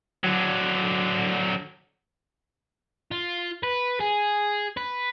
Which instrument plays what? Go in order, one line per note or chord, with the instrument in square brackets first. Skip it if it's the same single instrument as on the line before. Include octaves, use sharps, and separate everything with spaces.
[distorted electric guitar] D3 F#3
[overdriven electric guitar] F4
B4
G#4
B4